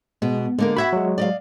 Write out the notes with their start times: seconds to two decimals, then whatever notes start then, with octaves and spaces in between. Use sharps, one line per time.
0.22 B2 G#3
0.58 D3 G#3 A#3 A#4
0.76 F#4 E5 F#5 B5 G#6 B6
0.93 F#3 G#3
1.18 D5 D#5 F5